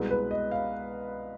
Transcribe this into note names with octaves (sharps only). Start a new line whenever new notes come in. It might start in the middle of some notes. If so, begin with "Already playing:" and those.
Already playing: C2 B2 G#3 B4
B4
D#5
F5